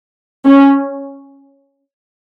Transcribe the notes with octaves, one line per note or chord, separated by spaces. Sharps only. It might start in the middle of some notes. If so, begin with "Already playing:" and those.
C#4